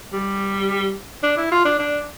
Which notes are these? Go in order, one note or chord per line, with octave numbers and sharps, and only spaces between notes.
G3
D4
E4
F4
D4
D4